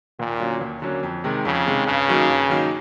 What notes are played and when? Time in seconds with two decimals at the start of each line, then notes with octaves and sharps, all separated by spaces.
0.20 D#2 A#2
0.40 D3 F#3 A#3 C#4
0.61 D#2
0.82 D3 F#3 A#3 C#4
1.03 F2
1.24 C3 D#3 G#3
1.45 F2 C#3
1.67 C3 D#3 G#3
1.87 G2 C#3
2.08 D#3 F#3 A#3 D#4
2.29 G2
2.50 D#3 F#3 A#3 D#4